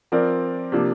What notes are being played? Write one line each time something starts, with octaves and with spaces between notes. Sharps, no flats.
F3 C4 A#4 D5
C3 F3 A#3 D4